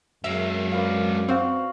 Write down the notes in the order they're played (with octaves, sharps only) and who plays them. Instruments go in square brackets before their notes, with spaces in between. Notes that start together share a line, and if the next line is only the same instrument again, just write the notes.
[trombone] F#2 [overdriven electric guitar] G#3 A#3 [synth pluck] E5
[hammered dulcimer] B4 D5 F5
[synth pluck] C4 [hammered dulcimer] F#4 F5 B5